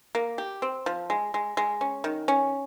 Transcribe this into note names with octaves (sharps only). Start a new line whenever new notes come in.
A#3
G4
C4
F3
G#3
G#3
G#3
C#4
D#3
C#4